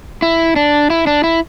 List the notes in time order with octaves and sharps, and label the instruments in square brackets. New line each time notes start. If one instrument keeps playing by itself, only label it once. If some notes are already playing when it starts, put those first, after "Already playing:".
[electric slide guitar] E4
D4
E4
D4
E4